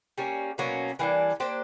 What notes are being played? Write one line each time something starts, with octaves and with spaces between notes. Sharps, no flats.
G3 A#3 C#4
B2 F#3 A#3 C#4
E3 G3 A#3 D4
A#3 D4 G4 C5